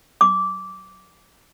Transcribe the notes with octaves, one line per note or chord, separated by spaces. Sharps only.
D6